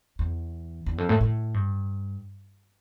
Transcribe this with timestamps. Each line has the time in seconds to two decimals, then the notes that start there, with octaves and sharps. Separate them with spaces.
0.19 E2
0.86 E2
0.98 F2
1.09 A2
1.21 A2
1.54 G2